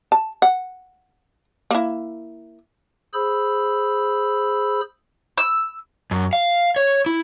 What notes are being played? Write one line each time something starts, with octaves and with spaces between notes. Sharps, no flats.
A5
F#5
A#3 E4
G#4 C5 B5 E6
E6
F#2
F5
C#5
E4